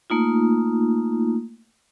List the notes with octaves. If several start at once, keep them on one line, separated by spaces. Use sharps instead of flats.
A3 A#3 D#4 F4